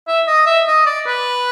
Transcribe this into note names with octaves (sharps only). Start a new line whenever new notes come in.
E5
D#5
E5
D#5
D5
B4